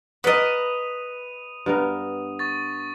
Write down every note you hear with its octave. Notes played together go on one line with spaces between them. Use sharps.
A#4 B4 D5 D#5 F#5 D#6 D#7
G2 B3 A#4
C#6 A6